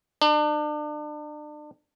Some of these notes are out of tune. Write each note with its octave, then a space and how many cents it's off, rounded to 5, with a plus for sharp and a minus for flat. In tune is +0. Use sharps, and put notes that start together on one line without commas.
D4 +35